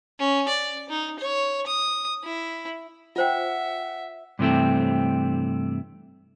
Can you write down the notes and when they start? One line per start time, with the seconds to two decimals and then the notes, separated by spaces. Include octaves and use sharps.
0.19 C#4
0.49 D5
0.89 D#4
1.19 C#5
1.67 D#6
2.24 E4
3.16 F4 C5 E5 F#5 G5
4.39 G2 C3 E3 A3 C4